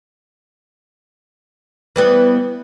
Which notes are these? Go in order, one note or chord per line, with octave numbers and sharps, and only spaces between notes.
E3 G3 B3